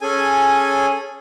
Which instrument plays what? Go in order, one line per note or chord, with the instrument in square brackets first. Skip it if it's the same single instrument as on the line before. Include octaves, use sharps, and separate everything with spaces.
[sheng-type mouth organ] C#4 G#4 A4 G#5